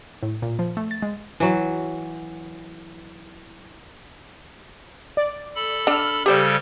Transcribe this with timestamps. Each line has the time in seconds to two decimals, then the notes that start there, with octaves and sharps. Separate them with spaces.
0.23 A2
0.42 A#2
0.59 F3
0.77 A3
0.91 A6
1.02 G#3
1.40 E3 F#3
5.17 D5
5.56 A4 B5
5.87 D4 E6 F6
6.26 C#3 G3 G4 A4 C5 D5